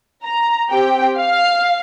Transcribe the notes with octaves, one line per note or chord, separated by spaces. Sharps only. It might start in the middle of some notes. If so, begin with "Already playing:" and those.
A#5
C4 G4 G5
F5